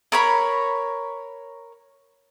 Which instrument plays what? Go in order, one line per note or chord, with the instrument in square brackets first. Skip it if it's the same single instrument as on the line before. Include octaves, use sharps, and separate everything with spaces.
[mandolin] A#4 C#5 B5